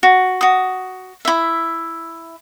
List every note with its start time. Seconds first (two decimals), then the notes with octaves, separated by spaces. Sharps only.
0.03 F#4
0.41 F#4 D#6
1.25 E4 E5